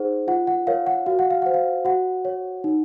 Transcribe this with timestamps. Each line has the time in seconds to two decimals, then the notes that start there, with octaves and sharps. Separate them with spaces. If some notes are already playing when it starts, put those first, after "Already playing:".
Already playing: D#4 G#4 C5 F#5
0.27 F4 F#5
0.47 F#5
0.67 A#4 C#5 F5
0.87 F#5
1.06 F#4 F5
1.19 F#5
1.31 F5
1.42 C5 F#5
1.54 F5
1.85 F#4 F#5
2.25 C#5
2.64 D#4